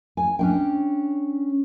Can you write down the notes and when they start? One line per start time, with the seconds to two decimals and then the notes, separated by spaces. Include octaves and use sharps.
0.17 G#5
0.39 C#4 D4 G5